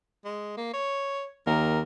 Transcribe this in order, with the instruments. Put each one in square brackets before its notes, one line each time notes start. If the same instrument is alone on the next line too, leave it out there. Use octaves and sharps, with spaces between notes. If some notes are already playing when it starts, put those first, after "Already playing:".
[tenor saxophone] G#3
A#3
C#5
[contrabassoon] D#2 [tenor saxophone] A#4